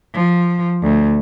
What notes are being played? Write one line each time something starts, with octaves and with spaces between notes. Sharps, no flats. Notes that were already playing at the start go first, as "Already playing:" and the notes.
F3
D2